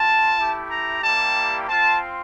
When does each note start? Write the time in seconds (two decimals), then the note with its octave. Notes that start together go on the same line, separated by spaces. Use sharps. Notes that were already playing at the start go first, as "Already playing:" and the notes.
Already playing: C4 F4 A5
0.39 A3 E4 G4
0.70 A#5
1.03 G3 A#3 E4 G4 A5
1.68 C4 F4 A5